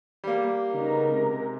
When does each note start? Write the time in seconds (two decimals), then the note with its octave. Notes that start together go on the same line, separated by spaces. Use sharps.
0.24 G3 A#3
0.73 C#3 B3 D#4 A#4
1.11 C3 G#3